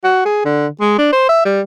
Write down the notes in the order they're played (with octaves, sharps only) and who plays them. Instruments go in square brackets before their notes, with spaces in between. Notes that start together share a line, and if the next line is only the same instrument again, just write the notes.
[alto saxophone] F#4
G#4
D3
G#3
D4
C5
E5
G3